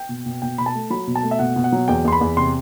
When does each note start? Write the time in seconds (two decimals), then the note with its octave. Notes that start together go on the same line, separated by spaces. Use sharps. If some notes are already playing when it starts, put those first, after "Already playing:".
Already playing: G5
0.09 B2
0.26 B2
0.42 B2 G5
0.58 B2 B5
0.66 A5
0.75 A3
0.90 F#3 B5
1.07 B2
1.15 A5
1.23 A3
1.31 E5
1.39 B2 F#5
1.56 B2
1.64 F#5
1.72 F#3
1.88 E2 G5
2.05 E2 C6
2.12 B5
2.21 E2
2.37 C3 C6